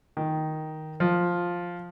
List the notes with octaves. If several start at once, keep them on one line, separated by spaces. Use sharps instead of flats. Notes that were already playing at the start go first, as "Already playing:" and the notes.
D#3
F3